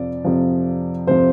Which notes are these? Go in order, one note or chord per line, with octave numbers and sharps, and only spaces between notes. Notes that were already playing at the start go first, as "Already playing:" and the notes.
Already playing: F2 C3 F3 D5
F2 C3 F3
F2 C3 F3 C5